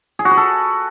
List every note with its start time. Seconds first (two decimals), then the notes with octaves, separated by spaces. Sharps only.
0.19 G#4
0.25 F#4
0.31 B4
0.37 A4